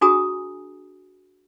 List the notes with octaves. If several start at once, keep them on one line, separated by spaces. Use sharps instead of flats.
D4 F#4 G#4 G#5 A#5 D#6